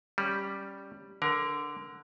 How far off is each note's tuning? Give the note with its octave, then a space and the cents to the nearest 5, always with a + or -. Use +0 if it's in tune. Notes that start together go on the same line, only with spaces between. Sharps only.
G3 +0 C#4 +0
D3 +0 A#4 +25